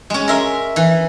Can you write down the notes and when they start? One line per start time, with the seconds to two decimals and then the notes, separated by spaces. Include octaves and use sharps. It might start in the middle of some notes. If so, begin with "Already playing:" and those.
0.10 G#3 C#4
0.28 A#4 E5 C6
0.76 E3